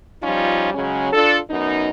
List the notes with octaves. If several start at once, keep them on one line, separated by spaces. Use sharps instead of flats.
F3 G3 C#4 D#4 F4
C#3 F#3 G#3 C#4
D4 F4 A4
F#2 B3 D#4